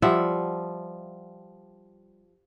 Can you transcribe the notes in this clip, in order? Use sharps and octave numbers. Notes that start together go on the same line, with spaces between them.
F3 G3 E5 F#5